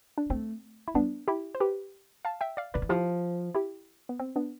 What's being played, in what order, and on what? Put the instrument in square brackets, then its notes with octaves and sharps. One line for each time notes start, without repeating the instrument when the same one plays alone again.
[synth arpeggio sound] D4
[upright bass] A3 [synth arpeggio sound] C4
[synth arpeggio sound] E4
[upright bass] G3 [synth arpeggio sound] B3 D4
[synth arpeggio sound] E4 G4
C5
G4 B4
F5 A5
E5 G5
D5 F5
[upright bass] D3 [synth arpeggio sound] B4 D5
[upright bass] E3
[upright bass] F3 [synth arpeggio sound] E4 G4
[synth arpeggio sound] E4 G4
B3
C4
B3 D4